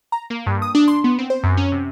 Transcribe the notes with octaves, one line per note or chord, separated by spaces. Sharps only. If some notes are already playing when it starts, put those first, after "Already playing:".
A#5
A#3
G2
D#6
D4
C6
B3
C4
C5
F#2
C#4
C3